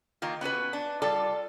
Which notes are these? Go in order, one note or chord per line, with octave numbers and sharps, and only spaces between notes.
D#3 A#3 F4
B3 C#4 F#4 B4
D4
G3 F4 A4 D5